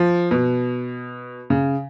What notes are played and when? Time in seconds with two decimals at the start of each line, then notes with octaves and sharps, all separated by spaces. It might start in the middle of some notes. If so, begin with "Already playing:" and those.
Already playing: F3
0.31 B2
1.50 C#3